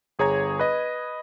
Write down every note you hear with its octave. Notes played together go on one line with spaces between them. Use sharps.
G1 G#4 C#5 A#5 G#6
B4 D#5